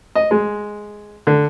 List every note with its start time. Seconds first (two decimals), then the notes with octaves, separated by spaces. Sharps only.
0.15 D#5
0.31 G#3
1.27 D3